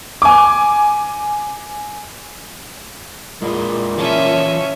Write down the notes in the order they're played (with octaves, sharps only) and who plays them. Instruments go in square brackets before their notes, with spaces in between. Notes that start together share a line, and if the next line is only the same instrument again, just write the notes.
[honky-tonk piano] G#5 D6
[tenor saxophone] A#2 [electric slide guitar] G#3 E4 G#4
[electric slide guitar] E3 F4 A5 [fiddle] C#4 E5